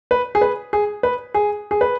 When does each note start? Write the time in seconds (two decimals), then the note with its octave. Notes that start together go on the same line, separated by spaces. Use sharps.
0.11 B4
0.35 G#4
0.41 B4
0.73 G#4
1.03 B4
1.34 G#4
1.71 G#4
1.81 B4